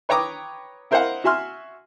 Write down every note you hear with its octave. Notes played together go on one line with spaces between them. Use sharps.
B4 C#5 G5 A#5 D6 D#6
E4 A#4 C5 D#5 F5 F#5
F#4 E5 G#5 C6 F6